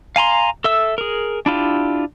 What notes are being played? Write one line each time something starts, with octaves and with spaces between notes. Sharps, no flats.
F5 G#5 A#5 C6
A4 E5 E6
G#4 A#4
D4 E4 F4 G4